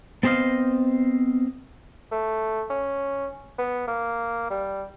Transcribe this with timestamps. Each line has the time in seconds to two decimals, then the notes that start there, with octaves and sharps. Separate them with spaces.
0.23 B3 C4 C5 D#5 F5
2.11 A3
2.70 C#4
3.58 B3
3.87 A#3
4.50 G3